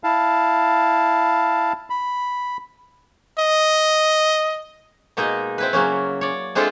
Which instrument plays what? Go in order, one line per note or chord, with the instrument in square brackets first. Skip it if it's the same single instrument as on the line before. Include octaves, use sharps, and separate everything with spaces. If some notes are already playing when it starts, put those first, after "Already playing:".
[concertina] E4 F5 A5
B5
[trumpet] D#5
[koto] B2 G#3 A#3 D#4 D#5
C4 E4 B4
C#3 F#3 A#3 C#4
C#5 D5
G#3 C4 D4 E4 F4 A4